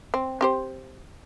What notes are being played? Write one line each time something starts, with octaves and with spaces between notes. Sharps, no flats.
C4
C4 G4 C5